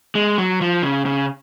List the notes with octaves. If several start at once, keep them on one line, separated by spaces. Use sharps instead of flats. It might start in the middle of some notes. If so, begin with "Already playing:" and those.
G#3
F#3
F3
C#3
C#3